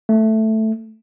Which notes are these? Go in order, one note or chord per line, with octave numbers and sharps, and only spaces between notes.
A3